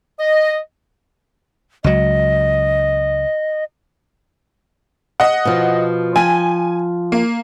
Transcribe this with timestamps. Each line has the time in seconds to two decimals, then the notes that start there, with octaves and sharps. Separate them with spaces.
0.19 D#5
1.84 C#2 F#3 D#5
5.20 D#5 F#5
5.45 B2 F3
6.16 F3 G5 G#5
7.12 A#3